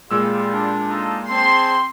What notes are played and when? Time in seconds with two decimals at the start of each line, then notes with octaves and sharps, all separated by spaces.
0.11 A#2 G3 G#3 F4 E6
0.53 D4
0.90 D#4 F4 A4
1.30 C4 G#4 C5 A5 C6